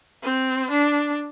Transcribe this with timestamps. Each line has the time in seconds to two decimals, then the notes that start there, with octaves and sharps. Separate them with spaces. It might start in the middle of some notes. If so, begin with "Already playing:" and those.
0.23 C4
0.70 D4